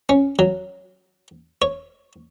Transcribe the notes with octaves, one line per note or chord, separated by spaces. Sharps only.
C#4
F#3
C#5